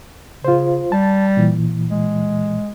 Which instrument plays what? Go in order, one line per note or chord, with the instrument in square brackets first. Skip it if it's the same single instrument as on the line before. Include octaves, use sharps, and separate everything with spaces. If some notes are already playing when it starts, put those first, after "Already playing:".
[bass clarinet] C#3 [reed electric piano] F4 C5
[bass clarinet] G3 [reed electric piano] A5
[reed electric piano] A#2 E3
[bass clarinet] G#3